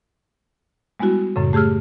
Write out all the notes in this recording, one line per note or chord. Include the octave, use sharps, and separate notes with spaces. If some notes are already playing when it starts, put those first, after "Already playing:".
G3 G#3 B3 E4 F#4
F#2 A2 C#3
A3 G4 G#4 E6 F6